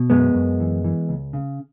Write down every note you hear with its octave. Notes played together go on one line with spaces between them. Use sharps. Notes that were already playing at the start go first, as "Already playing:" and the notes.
Already playing: B2
F#2 G#3 B3
F#2
E3
E3
C#2
C#3